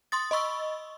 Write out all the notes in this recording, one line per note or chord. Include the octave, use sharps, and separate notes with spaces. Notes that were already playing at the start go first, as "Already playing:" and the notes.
C6 D#6 A6
D#5 B5 C#6 E6